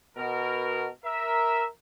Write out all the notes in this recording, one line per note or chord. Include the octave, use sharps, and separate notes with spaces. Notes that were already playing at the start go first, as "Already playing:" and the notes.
B2 A#4
A#4 E5